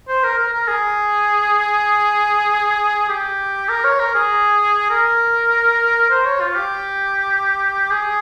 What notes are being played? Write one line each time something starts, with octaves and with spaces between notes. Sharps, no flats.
C5
A#4
A#4
A#4
G#4
G4
A#4
C#5
A#4
G#4
A#4
C5
C#5
F4
G4
G#4